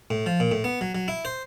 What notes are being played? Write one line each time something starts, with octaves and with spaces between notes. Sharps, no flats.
A2
F3
A#2
A2
B3
F#3
F#3
E4
C5